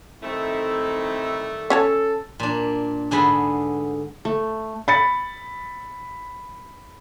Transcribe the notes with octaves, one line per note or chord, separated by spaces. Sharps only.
D#3 G3 A3 C4 D#4 E4
C#4 A4 C#5 A5
A#2 D4
G#2 D3 B3 G#4 A5 B5
A3
B5 A6 C#7